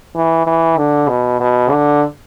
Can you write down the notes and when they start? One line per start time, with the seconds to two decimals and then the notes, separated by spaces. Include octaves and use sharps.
0.15 E3
0.47 E3
0.77 D3
1.08 B2
1.40 B2
1.71 D3